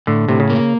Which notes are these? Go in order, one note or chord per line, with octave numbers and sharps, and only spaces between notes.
A2 D3
A2 C3
C#3
A#3